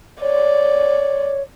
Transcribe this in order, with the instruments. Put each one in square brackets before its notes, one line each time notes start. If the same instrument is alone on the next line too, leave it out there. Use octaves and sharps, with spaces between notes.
[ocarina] C#5 [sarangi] D5